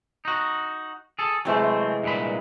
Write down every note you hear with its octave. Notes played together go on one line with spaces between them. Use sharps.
D#4 F#4
G#4 A4
C3 E3 F#3 G#3 A3 C4
G2 A#2 B5